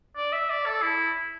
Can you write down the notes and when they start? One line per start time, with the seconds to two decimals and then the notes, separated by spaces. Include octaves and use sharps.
0.17 D5
0.32 E5
0.50 D5
0.66 A4
0.82 E4